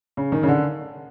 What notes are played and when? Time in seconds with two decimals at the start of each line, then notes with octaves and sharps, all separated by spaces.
0.17 C#3
0.32 D#3
0.43 C#3
0.48 D3